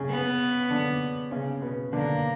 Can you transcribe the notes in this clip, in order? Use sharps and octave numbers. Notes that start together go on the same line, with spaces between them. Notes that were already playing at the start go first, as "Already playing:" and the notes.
Already playing: C#3 C#4
B3
D3 D4
C#3 C#4
B2 B3
D3 A#3 D4